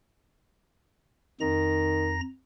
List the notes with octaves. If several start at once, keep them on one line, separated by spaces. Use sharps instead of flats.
F2 D#3 A#5 A#6